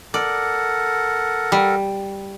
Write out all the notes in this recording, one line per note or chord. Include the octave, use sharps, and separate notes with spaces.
A4 A#4 D5 F#5
G3